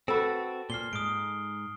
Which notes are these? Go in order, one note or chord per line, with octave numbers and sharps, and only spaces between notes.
C4 F#4 A4 B4
A#2 F6 C7 G7
G#2 D#6 D7